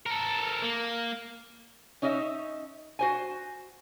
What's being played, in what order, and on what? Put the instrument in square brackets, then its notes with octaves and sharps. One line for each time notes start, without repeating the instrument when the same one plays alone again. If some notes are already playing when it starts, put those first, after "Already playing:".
[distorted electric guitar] A4 A#4
A#3
[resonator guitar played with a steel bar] C#4 D#4 C#5 D#5 E5
F#4 C5 G#5